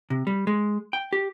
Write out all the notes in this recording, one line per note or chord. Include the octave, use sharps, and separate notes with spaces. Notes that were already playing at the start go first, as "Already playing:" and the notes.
C3
G3
G#3
G5
G4